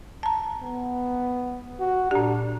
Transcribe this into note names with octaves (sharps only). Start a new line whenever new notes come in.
A5 A#5
B3
F#4
A#2 D4 G4